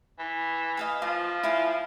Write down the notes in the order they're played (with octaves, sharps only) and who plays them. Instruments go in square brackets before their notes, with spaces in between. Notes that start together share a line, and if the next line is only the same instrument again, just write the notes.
[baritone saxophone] E3
[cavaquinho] D#5 F5 G#5
[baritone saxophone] F3 [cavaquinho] F4
[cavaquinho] E4 F5 G#5